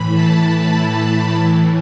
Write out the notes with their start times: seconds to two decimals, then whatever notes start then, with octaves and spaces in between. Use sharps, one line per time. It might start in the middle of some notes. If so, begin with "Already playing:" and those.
Already playing: A2 E3 B5
0.13 A5
0.52 B5
1.32 A2 E3